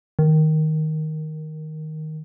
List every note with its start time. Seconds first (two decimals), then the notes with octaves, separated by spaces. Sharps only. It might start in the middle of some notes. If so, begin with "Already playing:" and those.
0.19 D#3